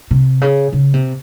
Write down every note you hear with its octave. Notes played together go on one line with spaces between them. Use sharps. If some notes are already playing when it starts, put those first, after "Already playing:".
C3
C#3
C#3
C3